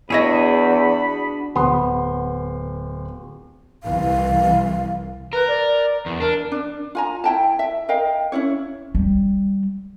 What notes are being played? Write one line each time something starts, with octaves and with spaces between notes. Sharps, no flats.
E2 D4 E4 F#4 G#4 C#5 D#5 B5
D1 B3 C6
C2 E3 F5
A#4 B4
D5
E2
D4 A#4
D4
F4 G#5 A#5
E4 G5 A5
E5
A#4 D#5 F5 G5
C#4 D4 E4 C#5
G3